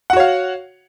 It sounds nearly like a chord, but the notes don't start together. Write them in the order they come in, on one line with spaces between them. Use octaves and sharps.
F#5 F#4 C#5 F5